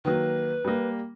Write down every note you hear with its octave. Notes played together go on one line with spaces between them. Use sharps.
D#3 F#3 A#3 B4
G3 A#3